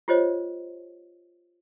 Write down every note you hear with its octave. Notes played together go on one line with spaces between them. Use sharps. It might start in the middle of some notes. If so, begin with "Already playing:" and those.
F4 G4 C5 C#5 D#5